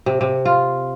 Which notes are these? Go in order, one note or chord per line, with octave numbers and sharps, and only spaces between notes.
C3
C3
F4